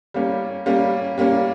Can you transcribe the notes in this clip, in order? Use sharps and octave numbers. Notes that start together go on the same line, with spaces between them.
G3 A#3 C#4
G3 A#3 C#4
G3 A#3 C#4